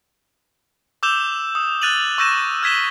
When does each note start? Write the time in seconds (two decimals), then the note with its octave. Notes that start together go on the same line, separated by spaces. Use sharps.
1.03 D6 E6 G6 E7 F7 G7
1.55 D#6
1.82 F6 F#6 A6 D#7 F7 F#7
2.18 C#6 E6 G6 A#6 D#7 E7
2.63 F6 G#6 B6 E7 G7